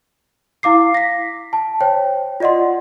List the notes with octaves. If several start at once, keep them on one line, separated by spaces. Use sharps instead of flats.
E4 F5 D6 C7
A#6 B6
A5
C5 C#5 G5
F4 D5 D#5 F#5 C6